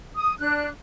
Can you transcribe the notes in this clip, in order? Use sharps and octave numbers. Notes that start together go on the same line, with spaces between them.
D#6
D4 F#6